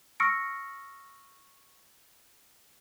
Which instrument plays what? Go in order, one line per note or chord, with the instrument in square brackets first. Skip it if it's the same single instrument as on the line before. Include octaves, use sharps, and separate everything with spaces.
[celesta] C#6 E6 F6 A#6 C#7 D7